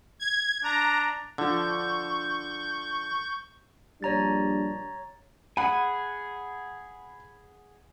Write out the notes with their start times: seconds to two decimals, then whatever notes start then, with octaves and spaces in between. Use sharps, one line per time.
0.20 G#6
0.64 D4 A#5
1.38 D3 F3 D4 C#6 G6
4.03 A#1 G3 D4 C#5 A#5 A6
5.57 G#4 F#5 G#5 B5